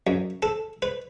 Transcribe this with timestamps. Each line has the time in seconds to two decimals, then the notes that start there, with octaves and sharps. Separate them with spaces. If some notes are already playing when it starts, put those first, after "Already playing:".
0.07 F#2
0.43 A4
0.82 B4